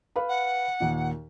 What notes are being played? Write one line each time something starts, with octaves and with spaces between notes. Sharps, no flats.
B4 F5 B5
F#5
D#2 A#2